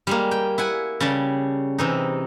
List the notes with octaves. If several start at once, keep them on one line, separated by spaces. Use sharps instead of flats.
G3 G#3 A#3
G5
E4 F#5 G#5
C#3 G3 D5 A5
C3 E3 D#4